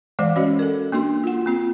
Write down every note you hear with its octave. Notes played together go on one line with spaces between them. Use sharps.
E3 G#3 C5 D5 F5 F#5
C#4 F#4 C#5 D#5
A4 A#4
A#3 D4 F#4 C6
F4 F#5
A#3 C4 F4